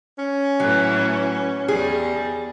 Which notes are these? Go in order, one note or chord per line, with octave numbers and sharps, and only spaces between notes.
C#4
A2 E3 F#3 B3
E2 G3 G#4